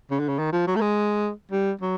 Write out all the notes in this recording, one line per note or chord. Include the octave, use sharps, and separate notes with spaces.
C#3
D3
C#3
D#3
F3
F#3
A3
G#3
G3
F#3